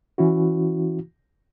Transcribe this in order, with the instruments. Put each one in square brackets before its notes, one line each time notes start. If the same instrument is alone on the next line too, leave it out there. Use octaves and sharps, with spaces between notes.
[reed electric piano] E3 C#4 E4 F#4